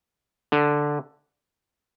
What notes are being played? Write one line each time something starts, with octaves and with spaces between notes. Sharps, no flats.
D3